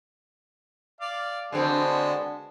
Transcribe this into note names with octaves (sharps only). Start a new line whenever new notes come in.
D5 F5
D3 G#3 B3 C4 F#4 A5